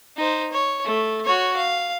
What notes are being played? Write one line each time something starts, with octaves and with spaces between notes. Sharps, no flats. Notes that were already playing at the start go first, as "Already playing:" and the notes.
D#4 C5
C#5
A3
F#4 C#5
F5